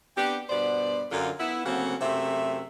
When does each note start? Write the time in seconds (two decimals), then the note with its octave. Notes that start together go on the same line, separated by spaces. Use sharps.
0.17 B3 C4 D4 G4
0.50 G2 B2 B3 C5 D5
1.11 F#2 D3 F4
1.40 B3 E4
1.65 D2 C#3 F#3 A#3 C4 F#5
2.01 F#2 C3 A3 C5 E5